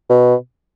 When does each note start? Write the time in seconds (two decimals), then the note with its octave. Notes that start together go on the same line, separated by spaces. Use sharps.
0.10 B2